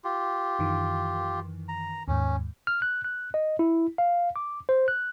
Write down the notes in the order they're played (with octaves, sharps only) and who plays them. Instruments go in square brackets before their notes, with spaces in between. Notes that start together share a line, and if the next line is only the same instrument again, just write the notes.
[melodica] F4 G4
[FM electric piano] F#2 D#3 E3
[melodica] A#5
[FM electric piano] D#2 G#2 [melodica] C#4
[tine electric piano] F6
F#6
F#6
D#5
E4
F5
D6
C5
F#6